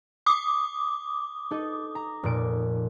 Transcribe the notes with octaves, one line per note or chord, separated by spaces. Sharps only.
D6 D#6
D#4 A4 D#5
A#5
F1 A#2 D7